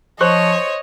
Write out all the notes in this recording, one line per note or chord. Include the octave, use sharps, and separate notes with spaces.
F3 C5 C#5 D#5 C#6 F#6